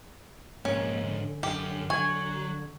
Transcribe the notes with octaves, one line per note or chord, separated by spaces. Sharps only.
F2 G#2 A#3 C#4
D3
F#2 G4
F#3 G#5 C#6 G#6